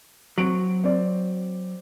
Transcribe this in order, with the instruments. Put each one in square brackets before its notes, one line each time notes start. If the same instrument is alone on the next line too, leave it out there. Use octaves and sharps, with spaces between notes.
[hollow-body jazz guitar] F#3 [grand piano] C4 D7 F#7
[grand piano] C4 D5